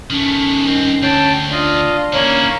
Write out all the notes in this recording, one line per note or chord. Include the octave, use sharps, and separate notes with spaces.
D#3 A3 C#4
G2 D#3 C4
D2 C#5 G5 A5
D4 F4 D#5
D#3 A#3 C#4 E4 C#5